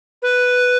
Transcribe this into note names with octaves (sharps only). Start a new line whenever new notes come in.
B4